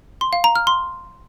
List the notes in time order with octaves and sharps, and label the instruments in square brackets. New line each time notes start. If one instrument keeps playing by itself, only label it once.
[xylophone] C6
F5
A#5
F6
C6